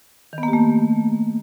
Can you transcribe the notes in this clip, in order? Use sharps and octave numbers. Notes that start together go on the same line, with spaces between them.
D#3
B3
A#3
G4
A3